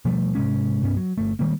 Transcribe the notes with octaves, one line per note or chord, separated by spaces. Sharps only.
B2 F3 G3 A3
G#2 C3 G#3 C#4
C2 G2 B3 C#4
F#3
G1 A3
D#3 G3 G#3 A#3